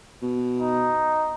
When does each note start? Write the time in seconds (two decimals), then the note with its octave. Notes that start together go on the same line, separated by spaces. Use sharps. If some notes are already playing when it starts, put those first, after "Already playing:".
0.22 B2
0.59 D#4